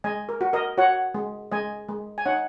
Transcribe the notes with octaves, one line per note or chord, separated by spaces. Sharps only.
G#3 D#5 G#5
A#4
F#4
A#4 D#5
F#4 C#5 F#5
G#3
G#3 D#5 G#5
G#3
G#5
D#4 C#5 F#5